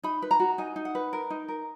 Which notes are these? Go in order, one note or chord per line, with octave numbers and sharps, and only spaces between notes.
D#4 B5
B4
A#5
F#4
D#4 G#5
D#4
F#5
B4
A#4
D#4
A#4